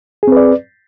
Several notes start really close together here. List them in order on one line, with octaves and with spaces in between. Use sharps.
G#4 C4 B4 D5